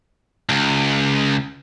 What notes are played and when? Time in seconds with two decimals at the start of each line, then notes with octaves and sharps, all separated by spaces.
0.49 C#2